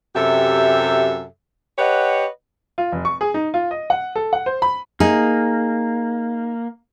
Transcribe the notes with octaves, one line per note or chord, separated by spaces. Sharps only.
F#2 C3 G4 A4 E5
G4 B4 C#5 D#5 F#5
F4
F1
C#6
G#4
D#4
F4
D#5
F#5
A4
F#5
C5
B5
A#3 D#4 G#4